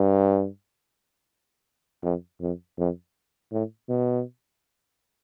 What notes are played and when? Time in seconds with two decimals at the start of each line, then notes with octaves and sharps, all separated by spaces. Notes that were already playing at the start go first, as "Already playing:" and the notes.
Already playing: G2
2.02 F2
2.40 F2
2.78 F2
3.51 A2
3.89 B2